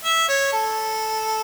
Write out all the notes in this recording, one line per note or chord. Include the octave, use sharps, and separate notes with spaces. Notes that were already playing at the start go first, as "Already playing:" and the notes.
E5
C#5
A4